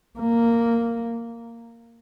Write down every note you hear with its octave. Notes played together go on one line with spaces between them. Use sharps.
A#3